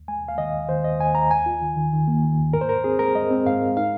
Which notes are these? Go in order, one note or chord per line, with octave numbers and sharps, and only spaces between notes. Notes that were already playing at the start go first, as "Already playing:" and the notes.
Already playing: D#2
G#3 G#5
D#2
F5
D#3 D#5
D#2
D#3 C5
D#2 D#5
D#2 G#5
D#2 A#5
D#2 G#5
F4
D#3
D#3
D#3
A#3
D#3
D#2
G#2 A#4
C5
G#2 A#4
C4 G#4
G#3 A#4
G#3 D#5
C4
G#2 F5
G#2
D#4 F5